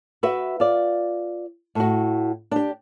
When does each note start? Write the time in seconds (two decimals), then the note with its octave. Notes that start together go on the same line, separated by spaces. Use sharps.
0.23 F#4 B4 E5
0.60 F4 D5
1.75 A2 F#4
2.51 D4 G4